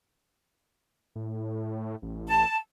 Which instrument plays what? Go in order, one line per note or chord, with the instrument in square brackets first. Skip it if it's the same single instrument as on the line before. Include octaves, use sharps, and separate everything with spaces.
[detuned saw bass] A2
A1
[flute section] A5